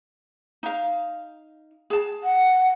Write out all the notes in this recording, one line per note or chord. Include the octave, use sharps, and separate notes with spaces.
D#4 F5
G#4 A5
F#5